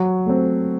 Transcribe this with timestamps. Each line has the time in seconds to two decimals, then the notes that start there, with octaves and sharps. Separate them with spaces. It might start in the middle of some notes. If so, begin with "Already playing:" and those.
Already playing: F#3
0.26 A3 C4